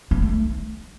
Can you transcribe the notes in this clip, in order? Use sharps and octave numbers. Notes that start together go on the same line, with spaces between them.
B3
A3